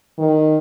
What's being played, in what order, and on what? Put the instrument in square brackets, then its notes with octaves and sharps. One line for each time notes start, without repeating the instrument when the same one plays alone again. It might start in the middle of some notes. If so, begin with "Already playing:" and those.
[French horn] D#3